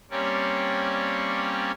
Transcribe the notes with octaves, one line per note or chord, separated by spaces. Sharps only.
G3 A#3 C4 C#4 C#5 D5